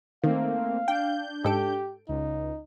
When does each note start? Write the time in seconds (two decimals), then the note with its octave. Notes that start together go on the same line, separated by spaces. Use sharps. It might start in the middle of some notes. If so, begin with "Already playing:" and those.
0.24 D#3 A3 A#3 C4 F5
0.88 D4 G5 G6
1.44 G#2 G4 A4 D7
2.08 C#2 D#4